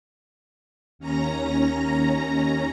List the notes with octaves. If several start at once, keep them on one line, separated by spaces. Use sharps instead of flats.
D#2 C#4 A#5 A#6